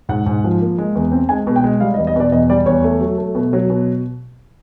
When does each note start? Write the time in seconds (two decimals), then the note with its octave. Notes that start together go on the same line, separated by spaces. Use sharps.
0.09 G#2 F#5
0.26 G#2
0.44 F3
0.61 A#3
0.78 G#3
0.95 E2
1.12 C4
1.29 G#3 G#5
1.47 B2
1.56 G5
1.64 G#3
1.80 G3 F5
1.94 D#5
1.98 E2
2.07 D#5
2.16 B2 D5
2.32 E2 D#5
2.50 G3 D5
2.66 E2 C#5
2.84 A3
3.00 F#3
3.18 A3
3.35 B2
3.53 F#3
3.70 B2